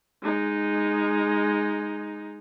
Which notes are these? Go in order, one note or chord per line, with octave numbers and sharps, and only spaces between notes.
G#3 D#4